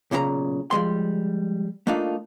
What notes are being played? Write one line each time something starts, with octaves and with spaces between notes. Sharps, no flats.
B1 A#2 C#3 G4 A#5
F3 G3 G#3 C6
A3 A#3 D4 D#4 F4